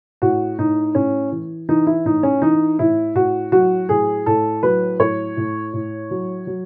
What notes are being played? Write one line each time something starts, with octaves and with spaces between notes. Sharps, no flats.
A2 F#4
A2 D#4
A2 C#4
E3
E3 D#4
E4
A2 D#4
C#4
E3 D#4
A2 E4
A2 F#4
F#3 F#4
A2 G#4
A2 A4
F#3 B4
A2 C#5
A2
A2
F#3
F#3